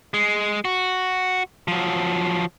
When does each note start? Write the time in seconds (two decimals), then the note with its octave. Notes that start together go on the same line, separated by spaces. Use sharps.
0.14 G#3
0.65 F#4
1.68 F3 F#3